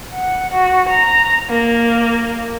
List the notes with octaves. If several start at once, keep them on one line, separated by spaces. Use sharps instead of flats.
F#5
F#4
A#5
A#3